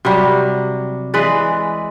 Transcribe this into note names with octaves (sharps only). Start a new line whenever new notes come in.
C3 F#3 G3
E3 G#3 B4 D5